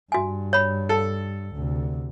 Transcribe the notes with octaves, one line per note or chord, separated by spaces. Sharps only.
G2 F#4 G#5
C#5 B5
A4
D2 C3